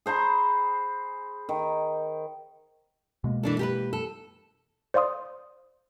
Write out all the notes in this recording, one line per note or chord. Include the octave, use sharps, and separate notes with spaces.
G#4 C5 A#5 B5
D#3
B2 G#3 A#3
E3 D4 A4
G4 A#4 B4
A4
C5 D5 F5 C6 D#6